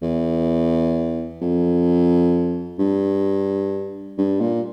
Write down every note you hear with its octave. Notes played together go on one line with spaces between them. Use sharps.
E2
F2
G2
G2
A#2